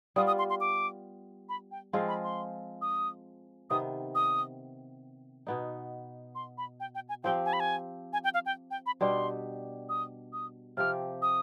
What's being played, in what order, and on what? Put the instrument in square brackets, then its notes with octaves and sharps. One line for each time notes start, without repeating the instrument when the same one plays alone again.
[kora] G3 B3 F4 [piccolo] D#6
[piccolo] D#6
C6
C6
D6
B5
G5
[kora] F3 G#3 C4 F4 [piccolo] G#5
[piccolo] B5
C6
D#6
[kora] C3 D#3 B3 [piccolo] D#6
[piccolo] D#6
[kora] B2 B3 D#4
[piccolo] C6
B5
G5
G5
G#5
[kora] F3 C4 G4 [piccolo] G5
[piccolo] G#5
B5
G#5
G#5
G5
F5
G5
G5
B5
[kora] B2 G3 D4 G4 [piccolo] C6
[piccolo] D#6
D#6
[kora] C3 F3 C4 G4 [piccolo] F6
[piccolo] D#6